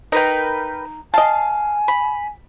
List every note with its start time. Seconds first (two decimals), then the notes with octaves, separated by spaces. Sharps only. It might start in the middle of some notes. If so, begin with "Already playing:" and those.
0.12 D#4 A#4 B4 G5
1.14 D#5 F5 G#5 A5
1.88 B5